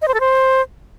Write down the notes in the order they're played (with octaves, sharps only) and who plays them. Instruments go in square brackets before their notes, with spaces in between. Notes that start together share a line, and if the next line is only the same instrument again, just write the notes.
[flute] D#5
C5
A4
C5